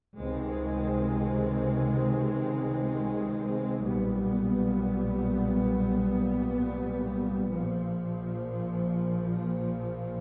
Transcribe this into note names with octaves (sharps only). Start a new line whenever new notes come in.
C#2 C3 D#3 G#3 C4
B1 A#2 G3 B3
A#1 A#2 F3